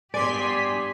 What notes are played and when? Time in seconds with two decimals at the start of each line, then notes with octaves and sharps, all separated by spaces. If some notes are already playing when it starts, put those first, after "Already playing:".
0.14 G2 B3 G4 D5 G#5 C6 B6